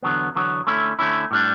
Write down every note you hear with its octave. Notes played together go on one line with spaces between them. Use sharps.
E2 D3 F#3 B3
E2 D3 F#3 B3
D3 A3 C#4 E4
D3 A3 C#4 E4
A2 G3 D4